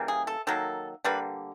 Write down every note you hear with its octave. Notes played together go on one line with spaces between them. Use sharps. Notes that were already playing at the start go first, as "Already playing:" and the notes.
Already playing: C#3 E3 G3 A#3
G#4
A4
D#3 F#3 A#3 A4
D3 G3 A#3 B4